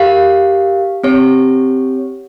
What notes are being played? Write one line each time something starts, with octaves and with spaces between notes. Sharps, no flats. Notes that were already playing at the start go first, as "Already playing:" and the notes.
Already playing: G4 A#4 F5
C4 G4 C#5